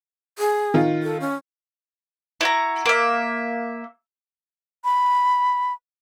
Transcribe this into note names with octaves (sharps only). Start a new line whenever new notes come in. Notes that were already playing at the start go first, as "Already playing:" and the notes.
G#4
D#3 F4
A4
C#4
E4 F#4 A#5
A#3 E5
B5